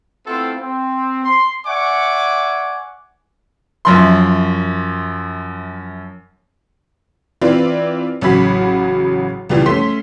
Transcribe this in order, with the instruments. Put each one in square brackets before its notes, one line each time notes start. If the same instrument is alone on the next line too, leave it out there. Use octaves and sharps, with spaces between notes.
[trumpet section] A3 B3 C4 E4 F4 A4
C4
C6
D5 E5 F#5 G#5 C#6 D6
[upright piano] F#2 F3 C6
[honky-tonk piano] E3 C4 E4 F4 B4 D5
A1 C#3 F#3 F#4 B5 B6
C#2 E3 F3 G3 F4
A3 C#4 C6 B6